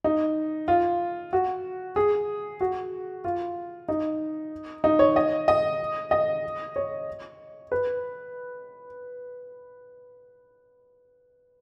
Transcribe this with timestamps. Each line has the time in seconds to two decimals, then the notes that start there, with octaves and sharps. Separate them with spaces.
0.04 D#4
0.68 F4
1.33 F#4
1.96 G#4
2.61 F#4
3.24 F4
3.88 D#4
4.84 D#4
4.99 C#5
5.16 D#5
5.48 D#5
6.11 D#5
6.76 C#5
7.72 B4